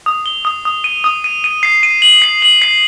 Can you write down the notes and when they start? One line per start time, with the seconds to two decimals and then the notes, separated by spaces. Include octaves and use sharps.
0.06 D#6
0.26 G7
0.45 D#6
0.65 D#6
0.84 D#7
1.04 D#6
1.24 D#7
1.44 D#7
1.63 C7
1.83 D#7
2.02 F#7
2.22 C7
2.42 F#7
2.62 C7